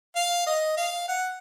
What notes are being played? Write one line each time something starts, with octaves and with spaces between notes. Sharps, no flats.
F5
D#5
F5
F#5